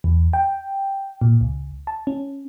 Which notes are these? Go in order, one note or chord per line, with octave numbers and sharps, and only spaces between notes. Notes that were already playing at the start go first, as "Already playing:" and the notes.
E2
G5
A#2
C#2
A5
C#4